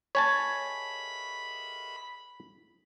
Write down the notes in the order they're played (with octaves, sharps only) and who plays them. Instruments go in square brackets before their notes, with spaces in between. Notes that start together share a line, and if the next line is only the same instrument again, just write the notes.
[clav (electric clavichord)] C#5 G#5 A5 [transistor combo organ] B5